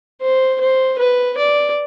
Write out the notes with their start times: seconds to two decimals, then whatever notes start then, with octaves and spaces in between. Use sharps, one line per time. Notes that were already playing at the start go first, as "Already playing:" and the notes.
0.22 C5
0.60 C5
0.98 B4
1.37 D5